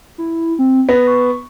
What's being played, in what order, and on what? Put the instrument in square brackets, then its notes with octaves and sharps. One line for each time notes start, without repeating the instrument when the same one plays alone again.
[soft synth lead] E4
C4
[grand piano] B3 [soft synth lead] A#6
[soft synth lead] C#6